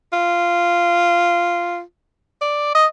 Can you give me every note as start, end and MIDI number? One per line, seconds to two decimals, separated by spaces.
0.13 1.81 65
2.41 2.71 74
2.75 2.86 75